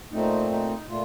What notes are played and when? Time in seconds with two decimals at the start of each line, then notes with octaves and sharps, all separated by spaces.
0.12 A#2 A3 C4 D#4
0.51 D#4
0.89 A#2 A3 F4